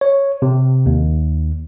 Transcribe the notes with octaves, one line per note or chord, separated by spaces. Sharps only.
C#5
C3
D#2